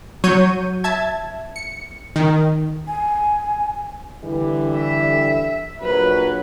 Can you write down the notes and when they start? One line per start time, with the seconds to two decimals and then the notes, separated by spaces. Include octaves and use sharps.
0.24 F#3 C#5 C#6 G6 D#7
0.84 E5 A5 G#6
1.56 C#7
2.16 D#3
2.88 G#5
4.24 D3 E3 G3
4.76 E5
5.82 A#1 F#3 B4